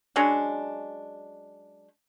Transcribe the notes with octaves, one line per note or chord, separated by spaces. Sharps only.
F#3 G#3 C#4 D4